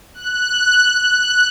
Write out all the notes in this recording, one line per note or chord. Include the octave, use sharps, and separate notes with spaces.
F#6
F#6